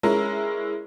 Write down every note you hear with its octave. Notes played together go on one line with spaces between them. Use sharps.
G#3 C#4 E4 A#4